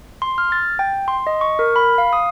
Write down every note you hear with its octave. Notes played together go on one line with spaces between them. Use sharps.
C6
F6
A6
G5
C6
D#5
C#6
A#4
B5
F5
D#6